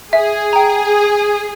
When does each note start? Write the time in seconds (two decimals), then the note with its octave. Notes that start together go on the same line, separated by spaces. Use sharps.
0.13 G#4 E5
0.53 G5 A#5